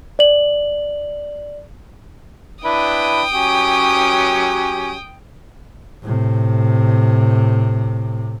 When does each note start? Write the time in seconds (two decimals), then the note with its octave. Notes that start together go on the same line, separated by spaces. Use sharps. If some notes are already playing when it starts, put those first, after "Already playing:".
0.19 D5 F#7
2.65 D4 E4 B4 G5 D#6
3.33 F#3 C#4 G4
6.02 A2 C3